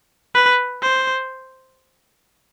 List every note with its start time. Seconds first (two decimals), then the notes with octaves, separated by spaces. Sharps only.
0.35 B4
0.82 C5